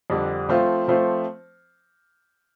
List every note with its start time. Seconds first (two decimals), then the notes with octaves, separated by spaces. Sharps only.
0.10 F2 D3 G3 D4
0.49 F3 A3 C4 F4 C5
0.88 F3 A3 C4 F4 C5